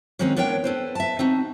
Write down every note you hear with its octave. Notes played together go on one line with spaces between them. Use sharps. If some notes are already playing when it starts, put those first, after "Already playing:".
D#3 G#3 C4 C#4 F#4 A#4
B3 D4 A#4 C#5 G5
A4 B4 C5
E5 A5
C4 D#4 F#4